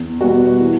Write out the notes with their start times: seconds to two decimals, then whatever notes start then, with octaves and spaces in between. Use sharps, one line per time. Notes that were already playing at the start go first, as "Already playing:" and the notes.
Already playing: E2
0.21 B2 G3 B3 F#4
0.61 E3